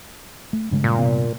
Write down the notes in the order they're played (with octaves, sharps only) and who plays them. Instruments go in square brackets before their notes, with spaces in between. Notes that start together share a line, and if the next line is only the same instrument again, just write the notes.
[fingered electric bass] A3
G2 C#3 G#3
[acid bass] A#2
[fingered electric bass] G2 C3 B3